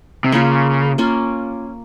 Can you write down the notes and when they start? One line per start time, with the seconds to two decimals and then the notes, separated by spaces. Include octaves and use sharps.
0.24 C3
0.32 C#3 A#3 C#4 F4
0.98 A#3 C#4 F4